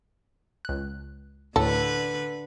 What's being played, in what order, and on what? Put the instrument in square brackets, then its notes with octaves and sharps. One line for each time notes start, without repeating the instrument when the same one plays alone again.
[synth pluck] C#2 F#6
[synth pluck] D2 A2 [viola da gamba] D3 B4 [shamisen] A4